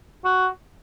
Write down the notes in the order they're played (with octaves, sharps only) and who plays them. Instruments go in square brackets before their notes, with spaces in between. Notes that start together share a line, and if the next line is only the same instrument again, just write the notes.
[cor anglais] F#4